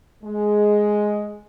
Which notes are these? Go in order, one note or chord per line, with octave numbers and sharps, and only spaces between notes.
G#3